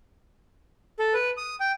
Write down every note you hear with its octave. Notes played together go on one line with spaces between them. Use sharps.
A4
B4
D#6
G5